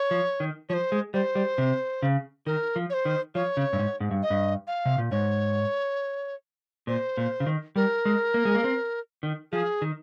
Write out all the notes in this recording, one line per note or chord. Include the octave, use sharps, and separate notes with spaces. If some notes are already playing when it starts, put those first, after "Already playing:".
Already playing: C#5
F3
D#3
F3 C#5
C5
G#3
G3 C5
G3
C3
C#3
D#3 A#4
F3
C#5
C5
D#3
F3 C#5
C#3
G2
G#2
G#2
G2
D#5
G2
F5
C3
A#2
G#2 C#5
A#2 C5
A#2
C#3
D#3
G3 A#4
G#3
A#3
G#3
A#3
C4
D#3
F3 G#4
D#3